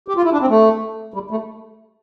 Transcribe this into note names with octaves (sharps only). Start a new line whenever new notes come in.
G4
F4
E4
D4
C4
A3
G3
A3